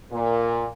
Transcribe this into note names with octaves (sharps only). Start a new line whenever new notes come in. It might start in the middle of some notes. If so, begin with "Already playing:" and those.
A#2